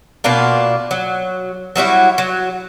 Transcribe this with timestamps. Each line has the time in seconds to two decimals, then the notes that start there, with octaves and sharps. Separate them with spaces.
0.24 B2 A#3 D4 F4
0.91 F#3
1.76 F#3 G3 E4 F#4
2.18 F#3